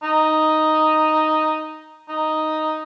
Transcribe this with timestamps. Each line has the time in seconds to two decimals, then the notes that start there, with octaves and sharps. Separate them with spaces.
0.03 D#4
2.09 D#4